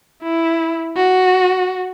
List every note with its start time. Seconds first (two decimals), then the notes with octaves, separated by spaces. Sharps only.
0.23 E4
0.96 F#4